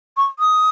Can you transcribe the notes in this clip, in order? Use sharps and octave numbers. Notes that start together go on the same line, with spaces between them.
C#6
D#6